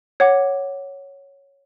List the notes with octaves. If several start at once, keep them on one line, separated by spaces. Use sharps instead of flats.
C#5 F#5 D6